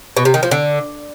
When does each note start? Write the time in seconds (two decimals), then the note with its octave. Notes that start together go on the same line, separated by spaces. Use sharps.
0.17 B2
0.25 C3
0.34 D#3
0.43 F3
0.51 D3